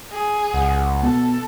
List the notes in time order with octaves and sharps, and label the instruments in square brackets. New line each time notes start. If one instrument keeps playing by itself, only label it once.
[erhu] G#4
[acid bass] C#2 [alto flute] F#5
[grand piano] B2 [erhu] A4